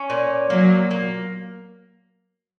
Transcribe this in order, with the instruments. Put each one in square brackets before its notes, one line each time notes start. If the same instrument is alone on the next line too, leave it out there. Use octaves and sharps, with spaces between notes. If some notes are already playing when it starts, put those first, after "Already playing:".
Already playing: [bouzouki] C#4
A#2
[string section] F#3 [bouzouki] A#3
[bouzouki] A#3